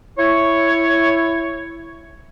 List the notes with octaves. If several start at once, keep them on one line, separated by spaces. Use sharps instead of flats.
E4 C#5